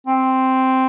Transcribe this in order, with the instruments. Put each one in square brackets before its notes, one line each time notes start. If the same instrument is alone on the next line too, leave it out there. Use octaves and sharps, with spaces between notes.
[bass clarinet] C4